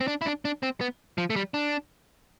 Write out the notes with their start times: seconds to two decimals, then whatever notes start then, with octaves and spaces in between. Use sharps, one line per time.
0.01 C4
0.08 D4
0.21 E4
0.26 D4
0.45 D4
0.63 C4
0.81 B3
1.18 F3
1.30 A3
1.36 G3
1.54 D4